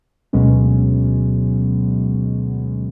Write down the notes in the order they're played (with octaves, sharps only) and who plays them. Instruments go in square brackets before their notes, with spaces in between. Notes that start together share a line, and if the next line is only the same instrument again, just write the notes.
[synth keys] D2 B2 F#3 G#3 B3 C#4